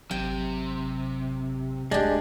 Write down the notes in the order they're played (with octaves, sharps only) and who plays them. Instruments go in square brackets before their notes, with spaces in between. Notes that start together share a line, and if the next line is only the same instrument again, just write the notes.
[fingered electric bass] G#1 F#3 [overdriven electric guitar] C3 [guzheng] G5
[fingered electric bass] D1 D2 A3 [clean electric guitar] G#3 [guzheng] D4 G4